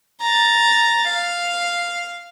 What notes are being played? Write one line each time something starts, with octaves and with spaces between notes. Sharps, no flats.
A#5 A6
F5